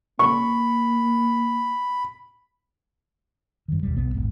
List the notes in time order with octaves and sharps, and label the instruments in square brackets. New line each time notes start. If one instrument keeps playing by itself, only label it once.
[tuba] A#3 [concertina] B5 [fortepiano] C#6
[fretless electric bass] G2 D#3
D#2 B2 G3
B1 B3
D#1 A1 G#2